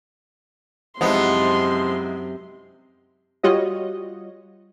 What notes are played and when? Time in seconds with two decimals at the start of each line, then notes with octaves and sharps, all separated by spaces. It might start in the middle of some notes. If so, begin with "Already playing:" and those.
1.01 F#2 C3 F3 G#3 B3 D#4 E4 C6
3.43 G3 F4 F#4 C#5 D#5